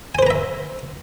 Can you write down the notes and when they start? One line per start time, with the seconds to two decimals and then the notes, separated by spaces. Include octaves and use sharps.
0.15 G#5
0.19 C5
0.23 B4
0.27 A#5
0.30 E5